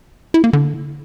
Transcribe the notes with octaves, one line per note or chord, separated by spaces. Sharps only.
E4
A#3
D3